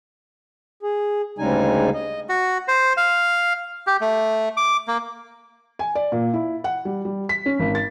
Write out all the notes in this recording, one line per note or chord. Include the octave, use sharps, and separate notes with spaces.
G#4
D2 C#3 G3 G#3 D#4 G#5
D#5
F#4
C5
F5
G4
A3
D6
A#3
G#5
D5
A#2
E4
F#5
G3
G3
B6
C#4
G#1
A6